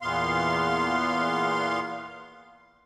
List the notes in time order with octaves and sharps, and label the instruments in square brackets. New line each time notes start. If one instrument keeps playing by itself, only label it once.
[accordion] E2 A#2 B3 F5 C6